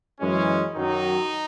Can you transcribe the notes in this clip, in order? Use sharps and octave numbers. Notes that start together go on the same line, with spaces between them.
F#2 E3 G#3 C#4
F#2 D#3 F#3 D#4